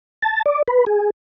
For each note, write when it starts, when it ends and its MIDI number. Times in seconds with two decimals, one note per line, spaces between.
0.22 0.42 81
0.46 0.62 74
0.68 0.85 71
0.86 1.10 68